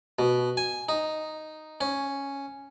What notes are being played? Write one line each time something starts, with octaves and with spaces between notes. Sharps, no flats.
B2
G#5
D#4
C#4